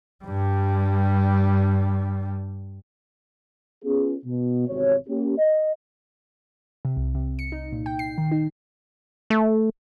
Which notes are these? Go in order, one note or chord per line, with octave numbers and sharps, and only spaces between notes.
G2 G3
B3 C#4 F4 G#4
B2
G#1 E2 C3 F#4 C#5
A#3 C#4 G4
D#5
C3
C2
C3
C#7
D#4
A#2
G5
C7
D#3
D#4
A3